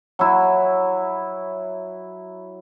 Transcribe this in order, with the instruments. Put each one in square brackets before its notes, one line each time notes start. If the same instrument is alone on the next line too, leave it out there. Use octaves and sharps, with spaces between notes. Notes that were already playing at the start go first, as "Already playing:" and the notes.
[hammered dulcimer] F#3 E4